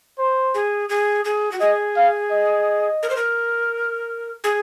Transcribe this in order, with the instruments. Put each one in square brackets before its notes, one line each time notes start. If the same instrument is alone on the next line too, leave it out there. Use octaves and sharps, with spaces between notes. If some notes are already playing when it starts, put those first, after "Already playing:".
[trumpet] C5
[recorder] G#4
G#4
G#4
F#4
[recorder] G#4 [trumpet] D#5
[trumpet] F5
D#5
[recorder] A#4
C5
A#4
G#4